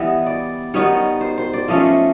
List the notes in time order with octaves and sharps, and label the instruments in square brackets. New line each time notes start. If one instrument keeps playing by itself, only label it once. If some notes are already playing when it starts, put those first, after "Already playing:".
Already playing: [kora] E3 G3 B3 D#5
D5
D#3 G3 B3 D#4 C#5
C5
C5
D5
F3 A3 C#4 D#5